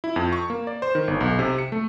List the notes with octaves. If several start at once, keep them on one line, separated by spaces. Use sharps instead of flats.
E4
F2
C#6
A#3
D5
C5
D#3
G1
B1
C3
C#7
A3